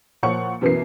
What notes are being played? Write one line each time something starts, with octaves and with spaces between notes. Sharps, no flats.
A#2 F3 C#5 F#5 C#6 C#7
F#2 B2 E3 B3 A#4 C7